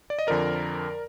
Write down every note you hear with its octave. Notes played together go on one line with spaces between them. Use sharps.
D5
D#5
F2 D3 F3 A#4 D5